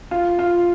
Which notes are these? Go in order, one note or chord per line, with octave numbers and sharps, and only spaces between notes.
F4
F4